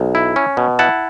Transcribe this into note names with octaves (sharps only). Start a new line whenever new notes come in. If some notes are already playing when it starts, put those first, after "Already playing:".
Already playing: B1
E4
C#4
B2
E4 F#5 A5